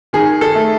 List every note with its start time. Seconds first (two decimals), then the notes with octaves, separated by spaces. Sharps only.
0.13 D#3 G#4
0.41 A4
0.55 A3